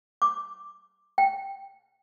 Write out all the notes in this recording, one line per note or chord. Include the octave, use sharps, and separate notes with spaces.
D6
G5